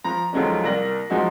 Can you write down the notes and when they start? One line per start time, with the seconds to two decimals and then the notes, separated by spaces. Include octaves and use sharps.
0.04 F3 A#5
0.33 D#2 F3 F#3 G#3 A3 C#4
0.64 C2 A#3 D5 A#6 F#7
1.10 F#2 F3 F#3 G#3 D#4 F#4